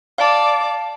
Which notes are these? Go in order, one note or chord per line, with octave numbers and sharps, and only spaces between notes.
D5 F5 A5 D6